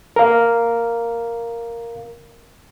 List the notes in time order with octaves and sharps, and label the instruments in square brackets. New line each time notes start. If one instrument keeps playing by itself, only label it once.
[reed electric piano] A#4 F5